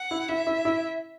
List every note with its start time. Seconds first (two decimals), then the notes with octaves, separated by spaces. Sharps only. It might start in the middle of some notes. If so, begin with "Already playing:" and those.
Already playing: F#5
0.11 E4
0.29 E4 E5
0.47 E4
0.65 E4